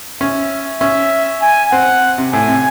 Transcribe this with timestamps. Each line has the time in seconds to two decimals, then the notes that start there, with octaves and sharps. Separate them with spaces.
0.21 C#4 E5
0.81 C#4 E5
1.42 G#5
1.72 C4 F#5
2.18 C3
2.33 A2 G#5
2.48 C3